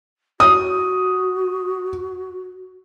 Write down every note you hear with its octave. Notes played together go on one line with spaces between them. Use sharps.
F#4 D#6